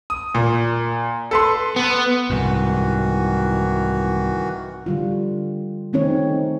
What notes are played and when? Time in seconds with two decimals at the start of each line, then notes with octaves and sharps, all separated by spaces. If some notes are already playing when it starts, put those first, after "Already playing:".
0.10 D#6
0.35 A#2
1.31 A4 B4 C6
1.76 B3
2.30 C2 G#2 D#3 E3 F#4
4.86 D3 G3 F4
5.93 D#3 A3 C4 C#4 D#4 C#5